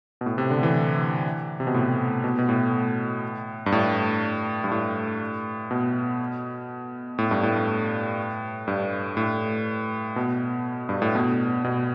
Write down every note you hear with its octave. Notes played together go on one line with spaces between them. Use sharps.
B2
A2
C3
D3
E3
C3
B2
A2
B2
B2
A2
G2
A2
G2
A2
B2
A2
G2
A2
G2
A2
B2
G2
A2
B2
B2